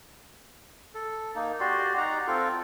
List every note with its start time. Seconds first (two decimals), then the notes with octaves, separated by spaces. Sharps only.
0.95 A4
1.35 A#3 D#4
1.60 F#4 G4 D5 C6
1.97 D#4 F#5 A#5
2.27 C4 F4 A4